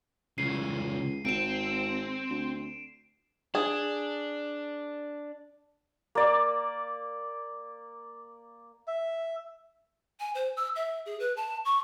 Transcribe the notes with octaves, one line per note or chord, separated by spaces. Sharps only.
C#2 C#3 E3 C7 D#7
G#1 C4 D7 E7
D2
D4 G#4
A#3 D5
E5
G#5
C5
E6
E5
G#4
B4
A5
C#6